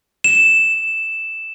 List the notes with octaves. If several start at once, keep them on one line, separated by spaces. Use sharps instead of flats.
E7